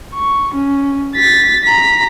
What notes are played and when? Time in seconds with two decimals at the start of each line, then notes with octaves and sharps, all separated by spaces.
0.15 C#6
0.55 C#4
1.16 A6 B6
1.64 A#5 B6